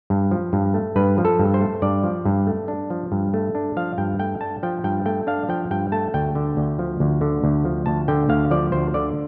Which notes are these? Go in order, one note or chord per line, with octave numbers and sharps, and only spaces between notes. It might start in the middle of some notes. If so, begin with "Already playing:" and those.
G2
F3
G2
A3
G2 B4
F3
A4
G2
C5
A3
G2 D5
F3
G2
A3
D4
F3
G2
A3
D4
F3 F5
G2 G5
A3 G5
D4 A5
F3 G5
G2 G5
A3 G5
D4 F5
F3 G5
G2 G5
A3 A5
D2 G5
D3
D2
F3
D2
D3
D2
F3
D2 A5
D3 G5
D2 F5
F3 D5
D2 C5
D3 D5